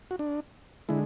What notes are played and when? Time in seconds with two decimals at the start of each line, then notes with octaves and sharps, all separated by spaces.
0.11 F#4
0.19 D4
0.89 D3 G#3 E4